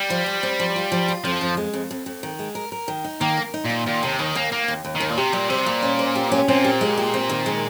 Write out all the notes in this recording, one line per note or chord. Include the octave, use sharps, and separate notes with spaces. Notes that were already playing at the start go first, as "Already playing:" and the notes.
Already playing: G3
F3
F3
C4
F3
F4
F3
F4
F2 F3
F2
G#3
F2
F2
F2
D#3
G#3
A#4
A#4
D#3
D#4
D#3 A#3
A#4
D#4
A#2 D#4
A#2 D#3
D#2 C3
D#2 D#3
D#2 A#3
D#2 A#3
D#2
D#2
D#3
D#2
A#2
C3 G4
A#2 G3
C3 C5
A#2 G3
C#4
C5
G4
C#4
A#2 C4
G4
G#3
G4
C4
D#3
G#3